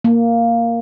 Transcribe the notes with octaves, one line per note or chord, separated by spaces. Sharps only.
A#3